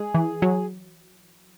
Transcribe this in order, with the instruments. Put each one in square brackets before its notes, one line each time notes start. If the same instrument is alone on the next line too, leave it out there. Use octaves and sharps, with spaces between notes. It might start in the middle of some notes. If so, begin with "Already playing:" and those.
Already playing: [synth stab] G#3 [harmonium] G#4
[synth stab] E3
F#3